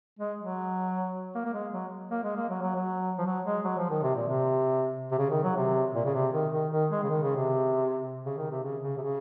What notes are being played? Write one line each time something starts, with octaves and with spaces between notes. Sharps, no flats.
G#3
F#3
A#3
A#3
G#3
F#3
A#3
G#3
A#3
F#3
F#3
F#3
F3
F#3
G#3
F#3
F3
D#3
C3
A#2
C3
C3
C#3
D#3
F#3
C3
A#2
C#3
C3
D#3
D#3
D#3
G#3
C#3
D#3
C#3
C3
C#3
D#3
C3
C#3
C#3
C3
C#3